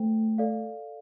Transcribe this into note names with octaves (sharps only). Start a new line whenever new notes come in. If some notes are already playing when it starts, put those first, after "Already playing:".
Already playing: A3 C5 G5
A4 D5 F5